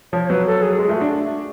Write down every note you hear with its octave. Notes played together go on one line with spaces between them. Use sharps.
F3 C#5
C#5
F#3 B4
A4
G#4
G#3
A3 F4
F#4
D4